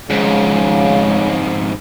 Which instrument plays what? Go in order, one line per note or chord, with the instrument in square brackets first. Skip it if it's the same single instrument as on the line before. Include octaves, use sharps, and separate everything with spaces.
[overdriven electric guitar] F2 G#2 [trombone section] C#3